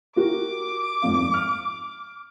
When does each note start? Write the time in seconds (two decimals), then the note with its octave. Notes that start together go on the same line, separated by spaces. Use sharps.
0.16 F#4 G4 A#4 D6
1.02 G#1 F2 F5
1.34 F6